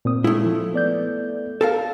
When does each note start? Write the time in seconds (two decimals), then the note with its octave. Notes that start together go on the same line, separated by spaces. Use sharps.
0.05 A#2 C4 D#6
0.24 G#3 A3 E4 A4
0.46 F3
0.74 B3 D5 G6
1.61 A4 A#4 F5